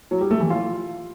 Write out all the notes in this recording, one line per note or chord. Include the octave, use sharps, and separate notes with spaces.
F#3
G3
A3
E3
F4